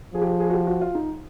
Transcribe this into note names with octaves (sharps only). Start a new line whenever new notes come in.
F3 G#4
G4
G#4
G#4
F#4
G4
F#4
F4
D#4